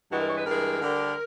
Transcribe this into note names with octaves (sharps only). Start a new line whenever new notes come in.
G2 E3 G#3 F#4
A#4
C#5
B4
G2 E3 G#3 A#4
D2 D3 G3